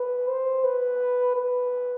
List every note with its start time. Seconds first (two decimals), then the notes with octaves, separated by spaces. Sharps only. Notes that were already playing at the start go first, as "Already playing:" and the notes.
Already playing: B4
0.28 C5
0.64 B4
1.36 B4